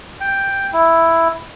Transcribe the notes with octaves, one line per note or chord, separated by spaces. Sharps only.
G5
E4